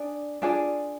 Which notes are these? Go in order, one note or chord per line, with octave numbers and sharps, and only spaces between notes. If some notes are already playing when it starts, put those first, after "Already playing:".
Already playing: D4 G#4 D5
D4 F4 G#4 D5